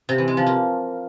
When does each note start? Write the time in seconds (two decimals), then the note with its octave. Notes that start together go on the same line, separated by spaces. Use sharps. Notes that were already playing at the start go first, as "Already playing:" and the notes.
0.09 C3
0.18 E3
0.28 G#3
0.37 F3
0.46 A#3